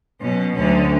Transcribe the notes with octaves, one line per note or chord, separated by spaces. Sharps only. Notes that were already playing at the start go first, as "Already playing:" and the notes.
B2 F#3 C#4
D2 D3 F#3 C#4